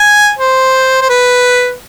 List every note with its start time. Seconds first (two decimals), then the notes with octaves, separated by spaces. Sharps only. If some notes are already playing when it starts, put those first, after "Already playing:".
Already playing: G#5
0.38 C5
1.01 C5
1.09 B4